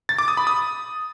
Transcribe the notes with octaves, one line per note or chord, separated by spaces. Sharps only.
A6
D6
D#6
B5
D#6